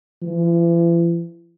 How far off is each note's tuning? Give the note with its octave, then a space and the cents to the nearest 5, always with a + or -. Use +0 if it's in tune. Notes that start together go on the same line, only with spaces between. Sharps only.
E3 +45